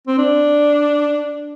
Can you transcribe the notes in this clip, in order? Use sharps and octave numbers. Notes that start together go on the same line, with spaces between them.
C4
D4